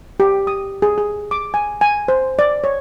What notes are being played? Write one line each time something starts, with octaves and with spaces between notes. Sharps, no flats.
G4
D#6
G#4
G#4
D6
G#5
G#5
C5
D5
C#5